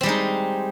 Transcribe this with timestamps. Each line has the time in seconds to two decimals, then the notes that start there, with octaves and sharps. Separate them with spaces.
0.01 C4
0.03 G3
0.06 G#3
0.09 D#4